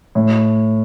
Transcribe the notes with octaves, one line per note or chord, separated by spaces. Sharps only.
A2